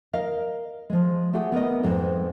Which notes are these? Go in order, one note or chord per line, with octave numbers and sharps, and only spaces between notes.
A#4 D#5 F5
F3 G#3
A3 G4 G#4 F#5 G#5
B3 A#4 B4 D#5
F2 G#2 G3 G#3 B3 C4